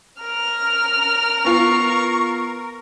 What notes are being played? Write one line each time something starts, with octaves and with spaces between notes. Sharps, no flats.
A#4 F6
B3 F4 C#6